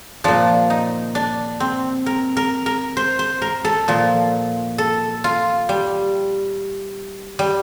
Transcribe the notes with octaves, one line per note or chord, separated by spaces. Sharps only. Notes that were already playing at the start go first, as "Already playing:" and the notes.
A#2 F3 D4
D#4
D4
C4
A#4
A#4
A#4
C5
C5
A#4
A4
A#2 F3
A4
F4
G3
G3